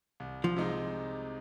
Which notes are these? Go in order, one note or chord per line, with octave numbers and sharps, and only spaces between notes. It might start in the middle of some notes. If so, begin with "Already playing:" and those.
C2
F3
C3 G#3 D#4